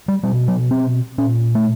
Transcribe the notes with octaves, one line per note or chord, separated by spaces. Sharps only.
G3
B2 G3
F#3
C4
A#2 C#4
A3